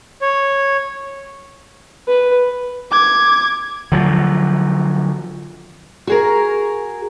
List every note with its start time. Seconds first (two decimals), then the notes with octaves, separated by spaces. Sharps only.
0.22 C#5
2.08 B4
2.91 D6 G#6
3.92 D3 F3 F#3
6.07 F#4 G#4 A#4